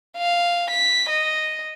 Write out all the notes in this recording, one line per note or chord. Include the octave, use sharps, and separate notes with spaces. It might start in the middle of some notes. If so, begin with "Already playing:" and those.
F5
B6
D#5